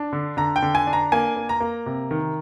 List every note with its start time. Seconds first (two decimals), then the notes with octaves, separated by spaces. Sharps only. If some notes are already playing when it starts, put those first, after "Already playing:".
Already playing: D4
0.13 D3
0.37 D3 A#5
0.56 G5
0.62 D3
0.75 G#5
0.87 D4
0.93 A#5
1.12 A#3 G#5
1.36 A#3
1.49 A#5
1.60 A#3
1.86 C3
2.11 D#3